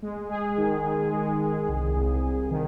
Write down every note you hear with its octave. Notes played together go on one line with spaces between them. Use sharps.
G#3
G#4
D#3
D#3
G#3
G#4
C2
C2
C2
D#3